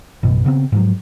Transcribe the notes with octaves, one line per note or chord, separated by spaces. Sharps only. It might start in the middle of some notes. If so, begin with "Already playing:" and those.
A1 F#2 B2
C#3 B3 C4
G#2 F3 F#3